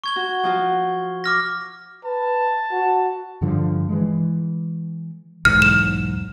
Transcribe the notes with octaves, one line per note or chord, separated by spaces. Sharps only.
C#6 G#6 G7
F#4
F3 F4 F#4
D6 F6 A#6
B4 A5
F#4
G2 D3 F3
E3 G#3
B1 E2 G#2 F6
E7